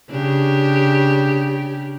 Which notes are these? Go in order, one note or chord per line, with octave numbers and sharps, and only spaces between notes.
C#3 D4 G4